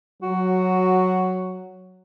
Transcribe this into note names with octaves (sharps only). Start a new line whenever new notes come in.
F#3 F#4